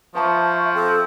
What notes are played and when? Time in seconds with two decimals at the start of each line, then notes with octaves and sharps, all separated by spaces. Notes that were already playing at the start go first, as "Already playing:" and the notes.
0.15 F3 C5 E5 A5 B5 C#6
0.74 C4 A4